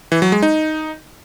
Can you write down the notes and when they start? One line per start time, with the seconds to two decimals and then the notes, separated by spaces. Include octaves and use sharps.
0.12 E3
0.22 F#3
0.32 G#3
0.42 D#4